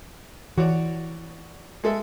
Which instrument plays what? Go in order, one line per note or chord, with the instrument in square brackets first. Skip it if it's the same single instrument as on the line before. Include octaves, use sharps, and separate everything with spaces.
[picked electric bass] E3 [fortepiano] F#4 C#5 D5
[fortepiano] G#3 A4 E5